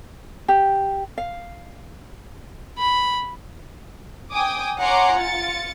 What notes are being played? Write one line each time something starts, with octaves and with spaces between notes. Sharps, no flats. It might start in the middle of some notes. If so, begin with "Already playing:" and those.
G4
F5
B5
G5 G#5 D6 D#6
C#5 F#5 G#5 A#5 C6 D6
F4 A6 C#7